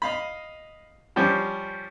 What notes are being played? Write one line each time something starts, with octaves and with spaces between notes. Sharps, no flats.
D#5 F5 B5
F3 G3 C#4 G4 C5